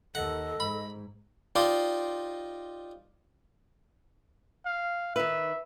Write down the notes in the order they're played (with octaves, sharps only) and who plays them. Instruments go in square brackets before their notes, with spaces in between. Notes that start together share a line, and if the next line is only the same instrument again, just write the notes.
[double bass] D#2 [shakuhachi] A4 [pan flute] D#5 [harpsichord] F#5
[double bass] G#2 [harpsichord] B5
[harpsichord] D#4 F4 G4 C5 D5 D#5
[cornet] F5
[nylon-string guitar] D#3 B4 [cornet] E5